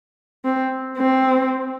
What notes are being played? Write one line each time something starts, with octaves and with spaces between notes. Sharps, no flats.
C4
C4